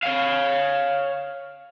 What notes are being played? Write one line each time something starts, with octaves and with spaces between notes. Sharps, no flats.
C#5 F5